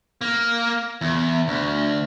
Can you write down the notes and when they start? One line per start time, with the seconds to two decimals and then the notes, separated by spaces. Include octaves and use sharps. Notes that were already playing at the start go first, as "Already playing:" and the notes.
0.21 A#3
1.01 E2
1.48 D2